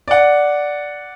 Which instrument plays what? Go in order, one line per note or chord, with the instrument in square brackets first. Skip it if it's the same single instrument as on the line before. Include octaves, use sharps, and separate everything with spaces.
[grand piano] D5 F#5